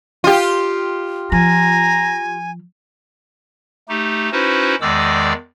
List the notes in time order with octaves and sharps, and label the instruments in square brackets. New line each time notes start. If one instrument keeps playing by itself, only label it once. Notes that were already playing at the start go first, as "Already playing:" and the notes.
[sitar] F4 G4
[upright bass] F3 [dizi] G#5 [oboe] A#5
[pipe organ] A3 D#4 G4
C#4 D#4 E4 F#4 B4 C5
E2 D#3 G#3 D5 D6 E6